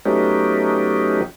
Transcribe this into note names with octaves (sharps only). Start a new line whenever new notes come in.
F#3 A3 B3 C#4 D#4 G4